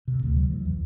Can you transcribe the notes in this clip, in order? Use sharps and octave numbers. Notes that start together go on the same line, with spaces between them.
C3
D2
F#3
E3
E2